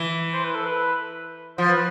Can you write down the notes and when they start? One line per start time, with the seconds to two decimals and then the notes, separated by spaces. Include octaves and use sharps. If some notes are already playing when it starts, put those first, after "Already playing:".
Already playing: E3
0.34 C5
0.44 B4
0.55 A4
0.66 B4
1.58 F3 C5
1.69 B4